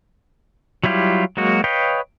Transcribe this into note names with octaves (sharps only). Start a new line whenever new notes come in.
F#3 G3 E4 F4 G4
F#3 G#3 A#3 F#4
B4 C#5 D#5 F5 G5